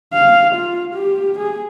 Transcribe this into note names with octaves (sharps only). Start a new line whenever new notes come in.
F5
F4
G4
G#4